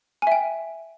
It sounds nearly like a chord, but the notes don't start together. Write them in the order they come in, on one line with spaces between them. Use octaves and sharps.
G#5 E5 G5